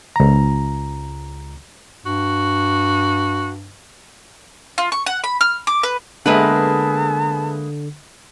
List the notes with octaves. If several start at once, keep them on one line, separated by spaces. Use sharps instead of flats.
C#2 A#5
G2 F#4
F4
C#6
F#5
B5
F6
D6
B4
D3 G#3 A#3 B3 G#4 B4 E5 A5